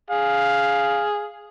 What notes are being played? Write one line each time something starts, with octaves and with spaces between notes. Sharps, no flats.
G#4 F5